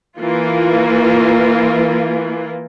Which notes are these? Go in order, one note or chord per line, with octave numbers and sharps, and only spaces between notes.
E3 A#3 F4